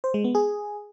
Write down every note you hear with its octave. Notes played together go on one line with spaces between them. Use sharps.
C5
G#3
B3
G#4